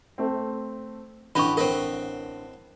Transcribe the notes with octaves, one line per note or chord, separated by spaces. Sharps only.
A3 C4
A1 D3 G4 B4 D#5 B5 C#6
C4 A#4 B4 D#5